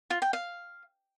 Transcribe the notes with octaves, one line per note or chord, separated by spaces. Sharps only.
F4
G5
F5